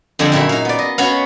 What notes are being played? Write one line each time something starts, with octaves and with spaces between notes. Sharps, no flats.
F2 D3 G3 G#4 A4
F#2 A#2 E4 B5
D#4 F5
B3 D5
D#5
B3 C#4 F#4 B4 C#5 F5